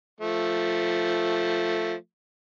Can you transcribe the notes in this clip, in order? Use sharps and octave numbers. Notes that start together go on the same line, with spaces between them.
F3 A3